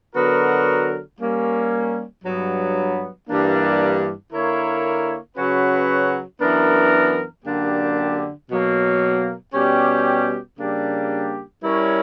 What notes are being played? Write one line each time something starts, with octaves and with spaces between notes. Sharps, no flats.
D3 F#3 B3 F#4 A#4
G3 A#3 C#4
G2 F#3 B3
G2 E3 G3 A#3 D4
D3 A#3 E4 A#4 C#5
C#3 F#3 C#4 F#4 B4
F#2 E3 B3 D4 A#4
F#2 D3 A#3 D4 G4
B2 F#3 A#3
B2 G3 C#4 G4
C#3 G3 A#3 D4 G4
G3 C#4 E4 A#4 C#5